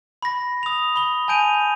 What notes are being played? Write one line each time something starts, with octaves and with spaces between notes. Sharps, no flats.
B5 A#6
D#6 F7
B5 G7
G#5 A5 G6 D7 D#7 F7